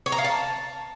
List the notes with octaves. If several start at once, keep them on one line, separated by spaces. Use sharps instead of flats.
C#5
A#5
F5
A5